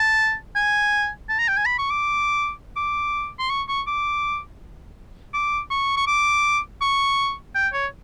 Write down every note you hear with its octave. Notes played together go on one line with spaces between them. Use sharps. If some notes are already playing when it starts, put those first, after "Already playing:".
Already playing: A5
G#5
A5
A#5
G5
G#5
B5
C#6
D6
D6
C6
C#6
C#6
D6
D6
C#6
C#6
D6
C#6
G5
C#5